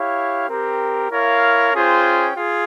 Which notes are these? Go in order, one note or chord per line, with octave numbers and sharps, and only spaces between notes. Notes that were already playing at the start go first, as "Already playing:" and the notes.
Already playing: E4 G4 C#5 F5
C4 G4 A#4
E4 A#4 C#5 F5
C#4 F4 G#4 C5 G5
F4 G#4